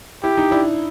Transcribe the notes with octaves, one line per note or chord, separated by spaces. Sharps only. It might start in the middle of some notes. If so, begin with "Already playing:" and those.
E4 G4
D#4
D4 E4